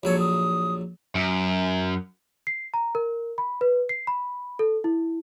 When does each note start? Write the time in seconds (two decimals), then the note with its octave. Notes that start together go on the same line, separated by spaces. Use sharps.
0.03 A#1 F#3 A4 C#5
0.19 D#6
1.15 F#2
2.47 C7
2.74 A#5
2.95 A#4
3.38 B5
3.61 B4
3.89 C7
4.07 B5
4.59 A4
4.84 E4